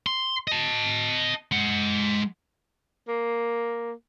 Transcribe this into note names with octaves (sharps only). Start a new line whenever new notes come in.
C6
D#5 A5
G#3 F#5
A#3